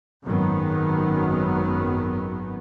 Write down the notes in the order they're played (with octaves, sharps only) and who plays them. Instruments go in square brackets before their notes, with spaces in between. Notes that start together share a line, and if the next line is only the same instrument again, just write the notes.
[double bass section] G#1 F#2 D#3 F#3 B3